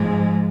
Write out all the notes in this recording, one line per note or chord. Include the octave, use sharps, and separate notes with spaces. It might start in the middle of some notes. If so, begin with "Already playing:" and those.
Already playing: G#2 F3 G#3